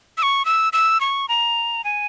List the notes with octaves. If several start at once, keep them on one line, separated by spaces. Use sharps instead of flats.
E6
C#6
E6
E6
C#6
A#5
G#5